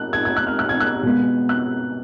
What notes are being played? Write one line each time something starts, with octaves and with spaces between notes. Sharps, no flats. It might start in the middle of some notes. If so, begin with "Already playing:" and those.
Already playing: A#3 F#6
G#6
G#6
F#6
F6
F#6
G#6
F#6
B2 G#3 B3
F#6